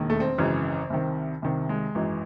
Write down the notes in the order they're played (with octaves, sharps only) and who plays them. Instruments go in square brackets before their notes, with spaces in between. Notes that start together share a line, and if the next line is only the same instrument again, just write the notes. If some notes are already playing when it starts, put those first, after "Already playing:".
Already playing: [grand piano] E1 D#2 D#3
A3
C4
G#1 F#2 C#3 E3
C2 C3 D#3
C2 C3 D#3
G#3
G#1 F#2 E3